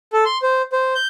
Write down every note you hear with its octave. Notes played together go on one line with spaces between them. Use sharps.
A4
C6
C5
C5
G6